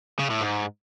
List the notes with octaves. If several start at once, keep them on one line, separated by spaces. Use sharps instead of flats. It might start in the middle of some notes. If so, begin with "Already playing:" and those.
C#3
A2
G#2